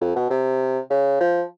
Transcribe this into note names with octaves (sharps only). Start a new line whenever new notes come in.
F2
B2
C3
C#3
F3